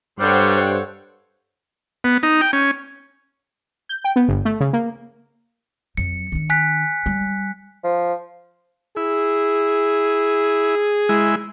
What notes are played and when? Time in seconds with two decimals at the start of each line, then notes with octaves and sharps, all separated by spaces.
0.20 G2 G3 A4 C5 C#5 F#5 G5
2.04 B3
2.23 D#4
2.41 G5
2.53 C#4
3.89 G6
4.04 G5
4.16 B3
4.28 G1
4.45 A3
4.60 C#3
4.73 A#3
5.97 F2 F#3 C#7
6.32 D#3 D4
6.50 G#5 F#6 B6
7.06 G3
7.84 F3
8.97 E4 G#4
11.09 G#3 E4